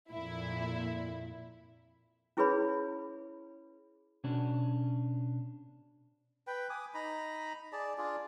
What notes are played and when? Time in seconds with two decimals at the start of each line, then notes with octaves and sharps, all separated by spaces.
0.10 F2 A#2 E4
2.37 C#4 E4 G#4 B4 C#5 B5
4.24 B2 C#4 D4
6.47 B4 G5
6.70 G#5 D6 D#6
6.94 D#4 A#5 B5
7.73 G#4 D5 A5
7.98 D4 F4 G#4 D5